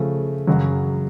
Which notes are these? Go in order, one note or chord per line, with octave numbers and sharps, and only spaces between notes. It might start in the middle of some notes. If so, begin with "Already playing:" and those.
Already playing: C#3 F3 A3
F#2 C#3 F#3